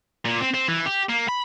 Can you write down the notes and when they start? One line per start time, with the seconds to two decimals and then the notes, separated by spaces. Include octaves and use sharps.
0.25 A#2
0.40 C4
0.54 C4
0.68 E3
0.86 G4
1.09 A#3
1.29 B5